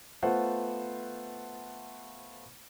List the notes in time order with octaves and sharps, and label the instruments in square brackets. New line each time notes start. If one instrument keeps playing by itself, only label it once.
[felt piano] A3 B3 F4 C5 F#5